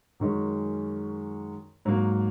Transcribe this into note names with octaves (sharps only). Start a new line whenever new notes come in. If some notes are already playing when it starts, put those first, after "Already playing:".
F#2 D#3 G#3 C#4
G#2 F#3 A#3